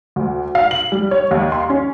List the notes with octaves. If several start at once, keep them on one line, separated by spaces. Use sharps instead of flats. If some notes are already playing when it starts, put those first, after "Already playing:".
D2
F5
F#7
G3
C#5
D#2
C6
C#4